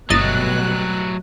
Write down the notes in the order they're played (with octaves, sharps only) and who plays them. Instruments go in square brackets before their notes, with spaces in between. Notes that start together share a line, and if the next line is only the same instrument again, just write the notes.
[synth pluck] G1 D#5 A6 [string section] B2 G3 F#6 [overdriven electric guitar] F#3 A3